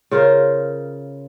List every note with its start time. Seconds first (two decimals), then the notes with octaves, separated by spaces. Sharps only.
0.11 C#3 F4 A#4 C5